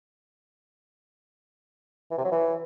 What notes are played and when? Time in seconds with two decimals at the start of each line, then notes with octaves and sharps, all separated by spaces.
2.11 E3
2.18 C3
2.25 F#3
2.32 E3